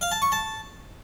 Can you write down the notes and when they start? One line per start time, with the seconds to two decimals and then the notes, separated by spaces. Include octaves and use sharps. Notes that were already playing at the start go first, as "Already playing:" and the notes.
0.01 F5
0.12 A5
0.22 C#6
0.32 A5